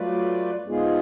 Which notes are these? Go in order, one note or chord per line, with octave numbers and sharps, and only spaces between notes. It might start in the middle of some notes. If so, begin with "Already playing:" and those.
Already playing: F#3 A3 F4 B4 D5
G#2 G#3 B3 F4 G#4